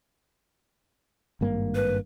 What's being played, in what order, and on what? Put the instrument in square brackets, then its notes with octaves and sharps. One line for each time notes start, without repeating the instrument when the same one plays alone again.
[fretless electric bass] G#1 G2 A#3
[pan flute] B4